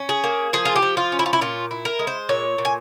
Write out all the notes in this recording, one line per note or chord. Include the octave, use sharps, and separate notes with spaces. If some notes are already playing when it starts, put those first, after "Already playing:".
Already playing: C#4
G#4
A#3
F3 G#4
F4
G4
F3
F4
C#4
E4
F4
E4
A#2 F4
E4
A#4
G#3
C5
A#2 C#5
A#2
G#5